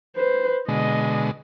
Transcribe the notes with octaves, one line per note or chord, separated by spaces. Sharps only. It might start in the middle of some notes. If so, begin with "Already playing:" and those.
B4 C5
B2 D3 G#3 D#5